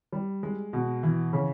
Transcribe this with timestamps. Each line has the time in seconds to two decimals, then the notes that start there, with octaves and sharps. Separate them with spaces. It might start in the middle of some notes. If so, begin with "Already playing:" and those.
0.12 G3
0.43 G#3
0.73 B2
1.03 E3
1.33 C#3